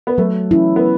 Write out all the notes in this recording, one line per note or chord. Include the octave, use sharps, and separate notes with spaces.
B3
F#3 A3
C#4 E4
B3